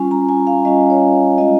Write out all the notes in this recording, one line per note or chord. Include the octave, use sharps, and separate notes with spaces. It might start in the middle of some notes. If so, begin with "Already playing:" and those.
Already playing: G3 C#4 F4 G#5
A#5
G#5
F5
G3 C#4 F4 D#5
C#5
G#3 C#4 F4 D#5